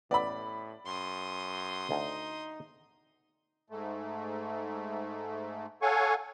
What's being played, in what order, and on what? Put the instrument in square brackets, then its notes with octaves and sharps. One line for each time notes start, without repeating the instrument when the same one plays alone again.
[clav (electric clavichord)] A1 B3 [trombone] A2 [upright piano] D5 B5
[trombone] F#2 [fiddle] C6 D#6
[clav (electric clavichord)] D2 [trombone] D#4
[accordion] G#2 A3
A4 C#5 F5 F#5 G#5 C#6